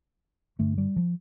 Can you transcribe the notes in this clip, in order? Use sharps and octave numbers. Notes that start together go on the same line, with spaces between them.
G2 D3 A3
G3
F3